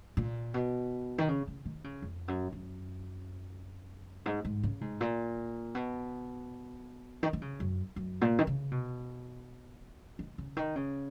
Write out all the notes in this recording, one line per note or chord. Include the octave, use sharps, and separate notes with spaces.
A#2
B2
D#3
C#3
C#3
D#3
C#3
F2
F#2
F#2
G#2
G#2
C#3
G#2
A#2
B2
D#3
D#3
C#3
F#2
F#2
A#2
D#3
C#3
B2
D#3
C#3
D#3
C#3